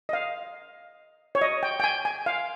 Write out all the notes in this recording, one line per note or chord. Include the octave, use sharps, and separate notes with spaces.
D#5
F5
C#5
D#5
G5
G5
G#5
G#5
F5